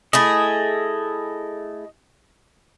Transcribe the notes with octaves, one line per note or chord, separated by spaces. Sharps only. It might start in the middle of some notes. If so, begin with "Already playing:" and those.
A3 E4 G#4 D#5